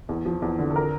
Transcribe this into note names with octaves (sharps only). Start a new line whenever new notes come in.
E2
F3
E2
D3
A4
A#4